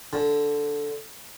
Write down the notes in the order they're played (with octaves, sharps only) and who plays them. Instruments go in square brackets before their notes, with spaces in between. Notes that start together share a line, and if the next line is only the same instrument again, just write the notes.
[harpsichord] D3